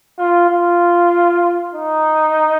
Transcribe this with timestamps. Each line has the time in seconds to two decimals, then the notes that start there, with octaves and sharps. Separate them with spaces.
0.18 F4
0.49 F4
1.75 D#4